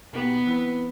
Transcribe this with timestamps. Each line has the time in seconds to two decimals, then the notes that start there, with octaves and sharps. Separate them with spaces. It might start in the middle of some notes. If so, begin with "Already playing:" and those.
0.13 B2 B3 D#4 G4
0.47 E3 C4 B4